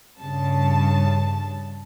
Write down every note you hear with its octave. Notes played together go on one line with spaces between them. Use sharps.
G2 C#3 A5